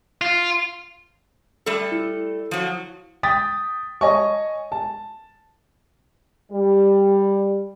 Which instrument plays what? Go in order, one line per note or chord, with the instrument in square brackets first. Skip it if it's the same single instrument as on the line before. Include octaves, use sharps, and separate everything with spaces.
[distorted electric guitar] F4
[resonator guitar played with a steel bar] G3 A3 A4
[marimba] E4
[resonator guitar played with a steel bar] F3 F#3
[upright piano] G5 D#6 A6 B6
C#5 D#5 G#5 A5 C#6
A5
[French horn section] G3